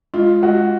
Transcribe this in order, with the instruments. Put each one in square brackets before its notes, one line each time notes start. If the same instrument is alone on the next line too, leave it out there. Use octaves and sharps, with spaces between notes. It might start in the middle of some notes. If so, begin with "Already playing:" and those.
[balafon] G#3 [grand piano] F4
[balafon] G#3 [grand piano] F#4